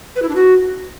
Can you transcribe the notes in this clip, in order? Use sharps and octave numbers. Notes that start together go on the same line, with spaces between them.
B4
E4
D4
F#4